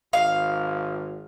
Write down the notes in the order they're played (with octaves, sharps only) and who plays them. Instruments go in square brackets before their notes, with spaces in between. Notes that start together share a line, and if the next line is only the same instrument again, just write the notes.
[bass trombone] G#1 [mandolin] F5